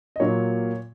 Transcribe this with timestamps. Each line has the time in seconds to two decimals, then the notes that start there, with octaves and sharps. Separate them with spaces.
0.16 D#5
0.20 A#2 F#3 A#3 C#5